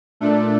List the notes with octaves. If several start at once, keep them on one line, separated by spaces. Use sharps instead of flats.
A#2 A3 D4 A4